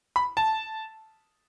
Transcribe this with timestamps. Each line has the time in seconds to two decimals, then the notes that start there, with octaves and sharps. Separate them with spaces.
0.16 B5
0.37 A5